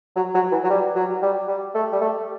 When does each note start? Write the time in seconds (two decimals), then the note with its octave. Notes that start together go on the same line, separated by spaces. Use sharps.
0.16 F#3
0.34 F#3
0.52 E3
0.64 F#3
0.70 G3
0.95 F#3
1.22 G3
1.48 G3
1.75 A3
1.92 G3
2.01 A3